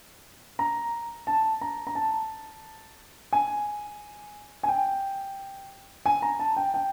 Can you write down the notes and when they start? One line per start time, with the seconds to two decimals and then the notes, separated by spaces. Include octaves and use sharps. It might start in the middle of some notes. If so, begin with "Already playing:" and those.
0.59 A#5
1.27 A5
1.61 A#5
1.87 A#5
1.95 A5
3.33 G#5
4.63 G#5
4.68 G5
6.06 G#5
6.22 A#5
6.39 A5
6.56 G5
6.74 G5